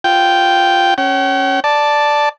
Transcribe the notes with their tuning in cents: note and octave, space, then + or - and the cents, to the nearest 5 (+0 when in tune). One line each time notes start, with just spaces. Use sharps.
F4 +0 G5 -5
C#4 -10 G5 -45
D5 +0 A5 +0